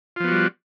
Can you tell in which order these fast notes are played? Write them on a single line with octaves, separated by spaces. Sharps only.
F4 F3 B3 F#4 G3